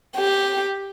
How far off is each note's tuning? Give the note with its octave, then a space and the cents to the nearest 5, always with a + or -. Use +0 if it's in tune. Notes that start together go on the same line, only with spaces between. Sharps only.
G4 +5